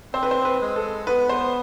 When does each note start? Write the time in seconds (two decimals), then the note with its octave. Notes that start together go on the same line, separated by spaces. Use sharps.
0.14 C4 C5
0.23 B4
0.31 C5
0.45 B4
0.61 G#3
0.76 A4
1.07 B3 B4
1.29 C5